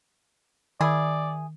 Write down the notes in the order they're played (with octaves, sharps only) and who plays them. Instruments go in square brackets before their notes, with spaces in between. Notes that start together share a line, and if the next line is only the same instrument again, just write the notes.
[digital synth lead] D#3 [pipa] E4 G#4 [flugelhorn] D5